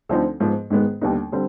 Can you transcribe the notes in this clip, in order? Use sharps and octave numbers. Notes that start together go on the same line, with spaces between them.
D2 D3 F3 C4 D#4
G#2 F3 B3
G#2 D#3 G#3 B3
D#2 D3 G3 B3 D#4
D3 G3 C4